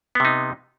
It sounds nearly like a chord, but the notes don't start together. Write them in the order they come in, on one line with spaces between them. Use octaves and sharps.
B3 C3 D#4